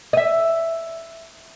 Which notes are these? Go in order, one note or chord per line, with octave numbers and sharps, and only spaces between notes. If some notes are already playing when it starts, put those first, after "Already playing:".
D#5 E5